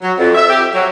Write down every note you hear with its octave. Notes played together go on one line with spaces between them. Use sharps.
F#3
F2
E5
G4
F#3